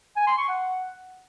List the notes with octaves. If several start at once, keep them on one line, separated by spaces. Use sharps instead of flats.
G#5
C6
C#6
F#5